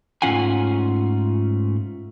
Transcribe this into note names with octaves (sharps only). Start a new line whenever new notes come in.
G#2 A3 C#4 F4 F#5 G#5